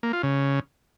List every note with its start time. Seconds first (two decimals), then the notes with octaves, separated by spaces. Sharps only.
0.03 A#3
0.13 F4
0.23 C#3